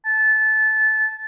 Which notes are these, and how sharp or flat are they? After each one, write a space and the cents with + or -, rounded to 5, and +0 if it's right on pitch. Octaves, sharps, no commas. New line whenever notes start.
A5 -20